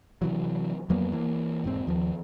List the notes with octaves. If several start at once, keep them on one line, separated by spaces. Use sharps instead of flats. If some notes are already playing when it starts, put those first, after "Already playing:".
C3 E3 F#3
F2 F#3 A#3 B3
E3 A#3
E1 G#2 C4
D#2 F3